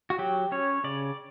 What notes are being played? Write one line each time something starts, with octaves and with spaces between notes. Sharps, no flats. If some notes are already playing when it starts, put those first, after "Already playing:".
F#4
F#3 G4
C#4 C#5
C#3 D5